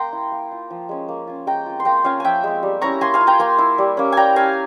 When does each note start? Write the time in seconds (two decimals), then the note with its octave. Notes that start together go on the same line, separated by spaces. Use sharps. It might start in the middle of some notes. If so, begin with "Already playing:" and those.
Already playing: A#3 G5 A#5 C6
0.13 E4
0.32 A#3
0.51 F4
0.70 F3
0.89 G#3 C#4
1.09 A#3
1.27 C#4 F4
1.47 G#3 G5 A#5
1.66 C4 F4
1.80 C6
1.85 A#3 G5 A#5
2.05 C#4 F4 F5 G#5
2.20 F3 E5 G5 G#5
2.44 G#3 C4
2.63 G3
2.82 C#4 E4 A#5 C#6
3.01 A#3 G#5 C6
3.14 F5 G#5
3.21 F4
3.27 G5 A#5
3.40 A#3 G#5 C6
3.59 E4
3.78 G3
3.97 A#3 C#4
4.12 G3 G5 G#5 A#5
4.36 C#4 E4 F5 G#5